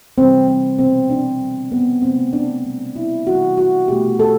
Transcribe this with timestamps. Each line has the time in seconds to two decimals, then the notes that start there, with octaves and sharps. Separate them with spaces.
0.17 C3 E3 G3 C4
0.48 C4
0.79 B2 G3 C4
1.10 D4
1.41 D3 G3
1.72 B3
2.02 C3 F#3 A3 C4
2.33 D4
2.64 B2 G3
2.96 E4
3.27 C3 E3 G3 F#4
3.58 F#4
3.88 B2 A3 G4
4.19 A4